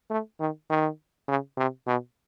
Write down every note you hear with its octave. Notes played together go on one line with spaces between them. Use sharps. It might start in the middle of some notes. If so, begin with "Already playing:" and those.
A3
D#3
D#3
C#3
C3
B2